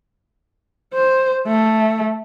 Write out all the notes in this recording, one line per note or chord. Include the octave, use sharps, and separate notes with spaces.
C5
A3